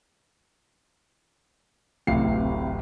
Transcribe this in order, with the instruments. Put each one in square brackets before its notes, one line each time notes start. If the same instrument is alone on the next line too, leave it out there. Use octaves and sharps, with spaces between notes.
[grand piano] D1 A1 A2 C3 F5 C7